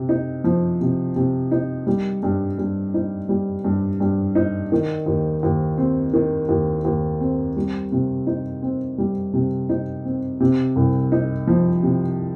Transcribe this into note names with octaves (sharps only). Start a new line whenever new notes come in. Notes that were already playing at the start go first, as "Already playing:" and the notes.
Already playing: C3
D#4
F3
C3
C3
D#4
G3
G2
G2
D#4
G3
G2
G2
D#4
D#3
D#2
D#2
C4
D#3
D#2
D#2
C4
G3
C3
D#4
C4
G3
C3
D#4
C4
C3
C2
D#4
F3
C3